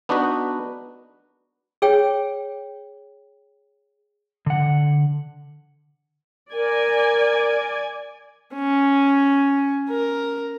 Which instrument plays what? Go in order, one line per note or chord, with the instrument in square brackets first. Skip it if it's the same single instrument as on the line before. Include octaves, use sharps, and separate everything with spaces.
[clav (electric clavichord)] B3 D4 D#4 F#4 B4
[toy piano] G#4 C#5 G5
[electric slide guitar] D3 F#5
[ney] A#4 [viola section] D5 G#5
[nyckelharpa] C#4
A#4